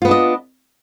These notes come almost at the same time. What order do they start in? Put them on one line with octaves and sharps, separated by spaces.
F4 B3 D4 D#5